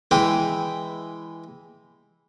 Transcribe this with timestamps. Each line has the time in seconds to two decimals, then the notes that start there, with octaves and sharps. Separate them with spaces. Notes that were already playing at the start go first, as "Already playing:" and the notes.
0.11 E3 G#3 E4 G5